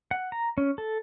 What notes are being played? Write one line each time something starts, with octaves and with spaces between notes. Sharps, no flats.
F#5
A#5
C#4
A4